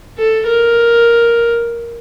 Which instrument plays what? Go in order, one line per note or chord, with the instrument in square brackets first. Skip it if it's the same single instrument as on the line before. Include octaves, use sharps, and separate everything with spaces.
[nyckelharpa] A4
A#4